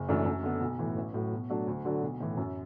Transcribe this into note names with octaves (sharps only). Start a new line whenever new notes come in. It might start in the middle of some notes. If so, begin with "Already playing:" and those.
Already playing: F#1
F#2 E3 A3 D4
F#2
D3 B3
B1
A2 E3
A1
A2 F#3
B2
F#3 A3 D4
D2
D3 F#3 D4
B1
A2 E3
F#2